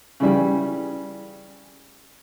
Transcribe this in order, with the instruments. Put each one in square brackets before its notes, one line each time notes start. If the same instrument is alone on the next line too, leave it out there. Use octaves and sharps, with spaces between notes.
[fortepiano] C#3 E3 G3